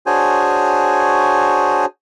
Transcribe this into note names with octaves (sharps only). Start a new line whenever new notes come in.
D4 F#4 G#4 C5 C#5 G#5